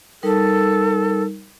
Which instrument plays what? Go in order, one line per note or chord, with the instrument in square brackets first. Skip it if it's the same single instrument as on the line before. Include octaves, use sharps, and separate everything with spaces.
[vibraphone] G3 D#4 A#4 [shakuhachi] A4